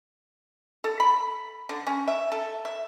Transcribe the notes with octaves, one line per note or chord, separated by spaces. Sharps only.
A4
B5
D3
C#4
E5
A4
E5